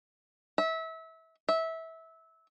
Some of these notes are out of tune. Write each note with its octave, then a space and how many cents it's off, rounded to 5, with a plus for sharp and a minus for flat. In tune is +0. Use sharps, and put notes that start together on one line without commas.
E5 -25
E5 -20